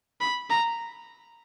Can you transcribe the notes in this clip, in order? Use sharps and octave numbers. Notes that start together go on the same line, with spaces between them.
B5
A#5